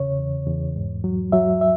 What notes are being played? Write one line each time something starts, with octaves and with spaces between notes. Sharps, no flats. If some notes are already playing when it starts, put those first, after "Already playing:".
Already playing: E2 C#3 C#5
E2
E2
G#2
F#3
F#3 E5
E5